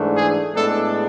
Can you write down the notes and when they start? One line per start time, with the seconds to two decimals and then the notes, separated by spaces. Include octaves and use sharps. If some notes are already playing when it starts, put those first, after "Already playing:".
Already playing: G#2 E3 A3 D4
0.15 G#4
0.54 A2 G#3 B3 D4 A4